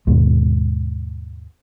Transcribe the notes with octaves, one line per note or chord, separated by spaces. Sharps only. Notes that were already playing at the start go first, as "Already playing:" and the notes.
D#2 G#2 B2 G#3